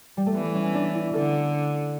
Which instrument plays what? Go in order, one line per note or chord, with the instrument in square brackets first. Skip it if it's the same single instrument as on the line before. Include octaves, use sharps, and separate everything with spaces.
[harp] G3
A3
[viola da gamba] E3 [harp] B3
[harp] C#4
D4
E4
[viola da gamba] D3 [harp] A4